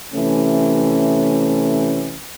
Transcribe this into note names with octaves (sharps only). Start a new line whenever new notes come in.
C3 E3 A3 C#4